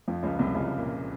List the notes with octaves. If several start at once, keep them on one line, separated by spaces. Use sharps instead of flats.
F2 F3
C#2 C#3
C2 C3
C#2 C#3
A#2